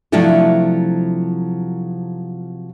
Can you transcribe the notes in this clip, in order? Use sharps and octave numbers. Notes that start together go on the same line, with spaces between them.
C3 F3 F#3 A3 D4 E4